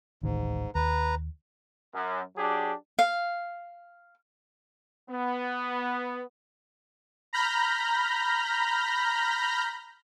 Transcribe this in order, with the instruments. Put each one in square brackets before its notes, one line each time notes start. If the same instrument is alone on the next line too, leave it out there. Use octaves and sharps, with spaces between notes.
[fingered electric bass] D1 A1 D#3 [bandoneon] G#2
[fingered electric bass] D#2 [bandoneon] B4 A#5
[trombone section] F#2
F#3 D4 G4 G#4
[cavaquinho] F5
[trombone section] B3
[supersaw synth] A#5 B5 F6 G6 A#6